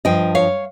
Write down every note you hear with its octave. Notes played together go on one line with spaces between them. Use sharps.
G2 F3 D#5 G5
C#5 F5